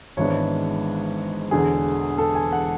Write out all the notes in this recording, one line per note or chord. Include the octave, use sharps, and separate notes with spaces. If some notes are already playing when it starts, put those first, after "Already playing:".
G#1 G#2 E3 B3 D4 C#5
E1 E2 D3 G#4
A4
G#5
F#5